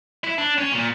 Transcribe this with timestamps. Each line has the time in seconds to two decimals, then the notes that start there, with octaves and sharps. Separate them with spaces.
0.24 E4
0.39 D4
0.58 C#4
0.73 A#2